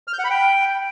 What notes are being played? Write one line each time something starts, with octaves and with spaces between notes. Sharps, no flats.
F6
G6
F#5
B5
G5